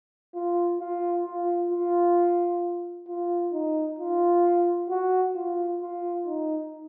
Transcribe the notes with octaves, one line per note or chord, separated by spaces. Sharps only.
F4
F4
F4
F4
F4
D#4
F4
F#4
F4
F4
D#4